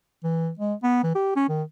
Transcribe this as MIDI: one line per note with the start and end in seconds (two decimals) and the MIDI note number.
0.24 0.50 52
0.59 0.74 56
0.83 1.00 59
1.04 1.14 52
1.15 1.35 67
1.36 1.45 61
1.49 1.63 51